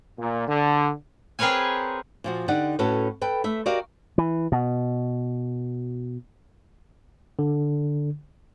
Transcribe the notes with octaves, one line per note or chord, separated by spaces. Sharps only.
A#2
D3
C4 G#4 A#4 B4 C#5 G#5
A#2 F3 F#4
D3 D#4 G4 D5 F#5
A2 C#4 F#4 A4 B4
A4 B4 G5
A3 E5
F#4 G4 A#4 D5 D#5 F5
E3
B2
D3